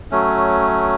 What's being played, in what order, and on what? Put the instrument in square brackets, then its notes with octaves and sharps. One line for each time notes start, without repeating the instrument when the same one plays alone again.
[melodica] F#3 A3 C#4